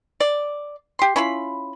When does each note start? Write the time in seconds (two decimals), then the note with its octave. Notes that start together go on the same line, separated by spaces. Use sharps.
0.20 D5
0.99 G4 C6
1.16 C#4 E4 F4 B5